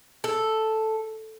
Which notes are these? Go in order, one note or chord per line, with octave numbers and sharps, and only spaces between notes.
A4